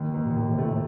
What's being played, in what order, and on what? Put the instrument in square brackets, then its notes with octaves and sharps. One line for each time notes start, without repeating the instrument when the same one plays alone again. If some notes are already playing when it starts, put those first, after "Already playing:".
Already playing: [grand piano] D#2
D#2
[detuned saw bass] A#2
[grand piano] D#2 [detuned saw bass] A2
[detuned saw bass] C3
[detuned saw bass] A#2 [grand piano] A3
[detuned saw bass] A2